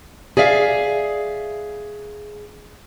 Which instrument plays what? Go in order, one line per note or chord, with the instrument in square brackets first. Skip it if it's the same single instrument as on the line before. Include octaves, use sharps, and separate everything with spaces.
[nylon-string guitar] G#4 D5 E5 F5